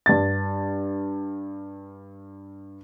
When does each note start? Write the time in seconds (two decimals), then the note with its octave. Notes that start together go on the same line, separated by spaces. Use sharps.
0.06 G2 A6